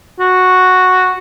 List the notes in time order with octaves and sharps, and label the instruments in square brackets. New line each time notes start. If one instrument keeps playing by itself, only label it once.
[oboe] F#4